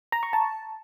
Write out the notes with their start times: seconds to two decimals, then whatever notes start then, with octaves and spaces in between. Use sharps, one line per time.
0.12 A#5
0.23 C#6
0.33 A5